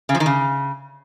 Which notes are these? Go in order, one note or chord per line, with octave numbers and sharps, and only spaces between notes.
C#3
F3
D#3
C#3